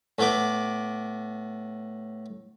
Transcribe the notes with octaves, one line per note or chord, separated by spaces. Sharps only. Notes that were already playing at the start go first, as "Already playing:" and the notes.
A2 B3 D6